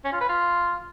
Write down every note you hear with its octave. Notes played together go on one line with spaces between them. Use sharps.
C#4
F4
B4
F4